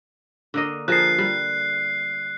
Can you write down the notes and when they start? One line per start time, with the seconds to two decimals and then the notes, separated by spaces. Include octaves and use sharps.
0.54 D3 A#3 D#5
0.88 F3 G#4 A#4 F#6 C7
1.18 G3